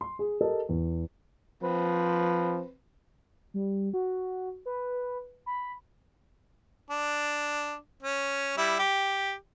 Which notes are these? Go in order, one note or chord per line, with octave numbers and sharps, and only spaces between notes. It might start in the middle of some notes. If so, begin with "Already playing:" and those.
C6
G#4
G4 A4 A#4 D#5
E2
F3 C4 B4
G3
F#4
B4
B5
D4
C#4
G3 E4
G4